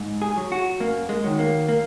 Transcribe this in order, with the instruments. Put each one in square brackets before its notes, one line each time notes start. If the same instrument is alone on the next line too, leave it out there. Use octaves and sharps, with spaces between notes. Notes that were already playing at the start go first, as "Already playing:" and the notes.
Already playing: [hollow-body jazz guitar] G#2
G#4
F#3
F#4
F#2 A#3
G#3
D#3 F#3
A#3
A#3